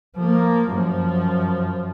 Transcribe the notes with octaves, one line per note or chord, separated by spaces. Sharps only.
F3 A#3
F#2 F3